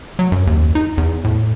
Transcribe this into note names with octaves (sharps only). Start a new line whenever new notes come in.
F#3
F#2
D#2
D#4
E2
A2